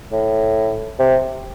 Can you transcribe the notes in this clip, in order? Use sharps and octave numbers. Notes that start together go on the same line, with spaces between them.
A2
C3